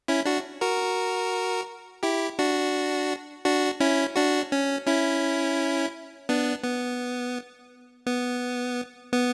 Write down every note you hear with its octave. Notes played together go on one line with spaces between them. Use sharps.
C#4 E4
D4 F#4
F#4 A#4
E4 G4
D4 F#4
D4 F#4
C#4 E4
D4 F#4
C#4
C#4 E4
B3 D4
B3
B3
B3